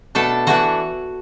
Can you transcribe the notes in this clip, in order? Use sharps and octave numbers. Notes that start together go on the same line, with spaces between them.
B2 A3 D4 A4 A5
E3 A3 D4 F#4 F#5